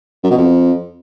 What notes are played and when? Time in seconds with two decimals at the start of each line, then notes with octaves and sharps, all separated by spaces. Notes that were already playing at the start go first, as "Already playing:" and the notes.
0.24 F#2
0.31 B2
0.38 F2